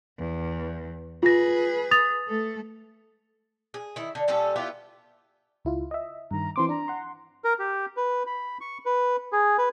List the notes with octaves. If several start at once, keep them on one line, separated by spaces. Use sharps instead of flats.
E2
F4 G#4 B4 A#6
D#6 A6 F7
A3 A4
G#4
D#3 E4
D3
A#2 G3 C#4 A4
B3 E4 F4 G4
C#2 E4 F4
D#5 E5
G2 D#3 A#5
E3 C4 C6 D6
D4 A#5
F#5 C6
A#4
G4
B4
B5
C#6
B4
G#4
B4